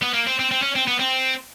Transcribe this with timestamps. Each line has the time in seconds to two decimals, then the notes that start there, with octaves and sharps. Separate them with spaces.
0.02 B3
0.14 A#3
0.27 C4
0.39 C4
0.51 C4
0.62 C#4
0.75 C4
0.88 B3
0.99 C4